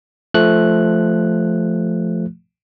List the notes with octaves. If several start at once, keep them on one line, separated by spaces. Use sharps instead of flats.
F3 A3 F#6